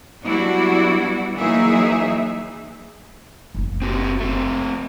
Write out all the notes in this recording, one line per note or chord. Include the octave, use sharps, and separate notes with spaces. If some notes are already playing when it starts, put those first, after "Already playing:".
F#3 G3 B3 D4 E4 F#4
E3 F#3 A#3 D#4 G#4 E5
F#1 A#3
C4 F#4 G4
F3 A3 C4